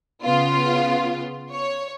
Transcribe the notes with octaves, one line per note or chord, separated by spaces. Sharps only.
C#3 B3 F4
C#5